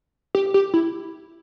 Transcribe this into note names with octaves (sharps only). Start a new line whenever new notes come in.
G4
G4
E4